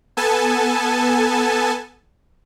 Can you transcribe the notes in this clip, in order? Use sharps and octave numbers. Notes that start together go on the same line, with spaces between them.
B3 A4 G#5 A5